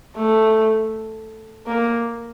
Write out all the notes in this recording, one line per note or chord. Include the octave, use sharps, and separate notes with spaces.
A3
A#3